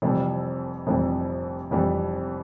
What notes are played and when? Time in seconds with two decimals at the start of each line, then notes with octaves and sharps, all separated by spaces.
0.02 F1 F2 C3 E3 G3
0.87 F1 F2 C3 E3 G3
1.71 F1 F2 C3 E3 G3